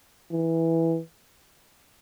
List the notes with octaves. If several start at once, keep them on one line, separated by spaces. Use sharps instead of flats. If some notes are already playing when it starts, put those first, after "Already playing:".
E3